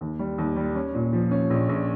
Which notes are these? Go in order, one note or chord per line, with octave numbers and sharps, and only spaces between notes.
D#2
G3
D#2
G3
C#4
A#2
F3
C#4
A#1
A#1